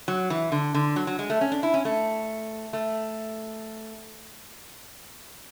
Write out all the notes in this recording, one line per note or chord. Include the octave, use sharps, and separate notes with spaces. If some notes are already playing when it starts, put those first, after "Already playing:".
F#3
E3
D3
D3
F#3
F#3
G#3
A3
C#4
D4
E4
C#4
A3
A3